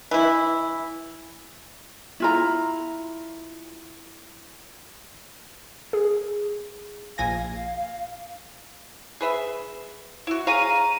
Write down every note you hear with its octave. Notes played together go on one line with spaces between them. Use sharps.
E3 E4
E4 F4 A#5
G#4
A#1 F5 G#5 A#6
G#4 B4 E5
E4 F#4
G#4 C#5 F5 A#5 D#7